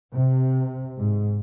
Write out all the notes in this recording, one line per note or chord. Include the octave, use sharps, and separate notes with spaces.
C3
G#2